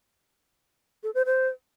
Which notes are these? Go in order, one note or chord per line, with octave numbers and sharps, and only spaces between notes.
A4
C5
C5